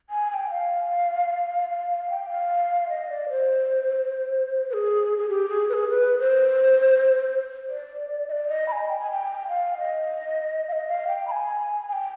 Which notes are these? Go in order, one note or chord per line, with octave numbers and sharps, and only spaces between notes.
G#5
G#5
G5
F5
F5
F5
G5
F5
D#5
D5
C5
B4
G#4
G#4
G4
G#4
B4
G#4
B4
C5
D5
D#5
D5
D#5
B5
G#5
G5
G#5
G5
F5
D#5
F5
D#5
F5
G5
B5
G#5
G#5
G5